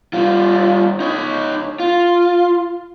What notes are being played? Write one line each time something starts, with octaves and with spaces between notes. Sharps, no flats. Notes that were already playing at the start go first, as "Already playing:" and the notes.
G3 F4
D#4 C#5
F4